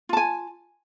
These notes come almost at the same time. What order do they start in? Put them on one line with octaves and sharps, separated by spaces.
F4 A5 G#5